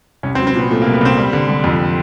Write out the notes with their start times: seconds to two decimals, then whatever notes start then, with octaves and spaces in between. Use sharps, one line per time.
0.23 C2 C#4
0.35 C4
0.39 F#3
0.47 C4
0.55 A#2 B3
0.70 A#2 A3
0.82 A#3
0.86 C2
0.93 B3
1.01 C2 C4
1.17 G3
1.33 D3
1.48 G3
1.64 F2